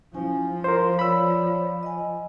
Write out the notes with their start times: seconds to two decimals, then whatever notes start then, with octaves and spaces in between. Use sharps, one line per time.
0.14 F3 C#4 E4 G#5
0.64 A#4 C5 C6
0.99 C#5 D5 B5 E6
1.83 D#5 G#5